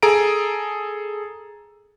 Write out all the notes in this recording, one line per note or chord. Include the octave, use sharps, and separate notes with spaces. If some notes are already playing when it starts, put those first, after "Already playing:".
G#4 A4 A#5 D7